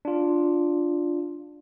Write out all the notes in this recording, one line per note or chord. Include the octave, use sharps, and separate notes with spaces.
D4 F4